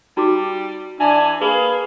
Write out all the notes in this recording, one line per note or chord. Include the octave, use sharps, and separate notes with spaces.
G3 D#4 F#4 D6
E3 D4 G#5
A#3 G#4 B4